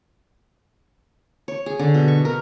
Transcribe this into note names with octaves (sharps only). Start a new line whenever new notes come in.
C#5
G#4
D3
B2
C#6
A#4